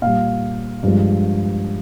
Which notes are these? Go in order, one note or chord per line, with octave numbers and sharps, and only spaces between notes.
A#2 G3 F5
G2 F3 G#3